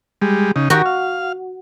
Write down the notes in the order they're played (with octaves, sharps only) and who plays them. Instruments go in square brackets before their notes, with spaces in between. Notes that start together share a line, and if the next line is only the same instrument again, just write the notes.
[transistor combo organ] G3 G#3
C#3 D#4
[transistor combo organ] D#3 G4 A#4 [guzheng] F#4
[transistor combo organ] F5